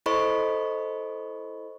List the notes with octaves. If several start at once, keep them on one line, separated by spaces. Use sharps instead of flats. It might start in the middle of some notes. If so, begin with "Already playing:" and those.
E4 A4 C5 D#5 B5 C#6